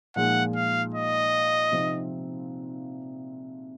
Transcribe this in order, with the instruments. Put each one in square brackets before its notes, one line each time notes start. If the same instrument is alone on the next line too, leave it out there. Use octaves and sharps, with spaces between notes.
[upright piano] A#2 F3 G#3 D#4 [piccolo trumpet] F#5
[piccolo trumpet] F5
D#5
[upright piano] C3 F3 C4 D#4